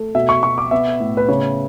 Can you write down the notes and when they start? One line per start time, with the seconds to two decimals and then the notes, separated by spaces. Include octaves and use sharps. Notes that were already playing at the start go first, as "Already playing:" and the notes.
Already playing: A3
0.15 B2 E5
0.29 C#6
0.43 B2 C#6
0.58 D6
0.71 B3 E5
1.00 A2
1.17 B4
1.29 C#3 C#5